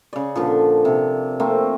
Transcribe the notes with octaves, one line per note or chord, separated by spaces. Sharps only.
C#3 D5
A#2 D3 F3
C3
A3 A#3 C4